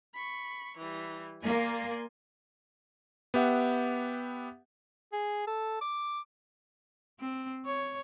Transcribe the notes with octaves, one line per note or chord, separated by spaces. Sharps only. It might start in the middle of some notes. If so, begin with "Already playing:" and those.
B5 C#6
E3 G3
A#3 D5 G#5 C6
B3 G4 E5 F#5
G#4
A4
D6
C4
C#5